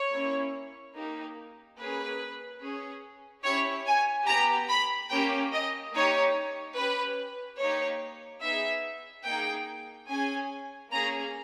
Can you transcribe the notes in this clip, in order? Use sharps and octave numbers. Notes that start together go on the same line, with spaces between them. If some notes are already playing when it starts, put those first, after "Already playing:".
Already playing: C#5
A#3 C#4 E4
A#3 D#4 G4
A#3 C#4 G#4 B4
C#4 G#4
C#4 E4 G4 C#5
G#5
B3 G4 A#5
B5
A#3 C#4 G4 G5
D#5
A#3 D#4 G4 C#5
C#4 G4 B4
A#3 D#4 G4 C#5
B3 D#4 G#4 E5
A#3 D#4 G#4 G5
C#4 G#4 G#5
A#3 C#4 G#4 A#5